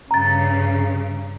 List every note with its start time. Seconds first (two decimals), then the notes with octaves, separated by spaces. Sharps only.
0.11 G2 C#3 A#5 A6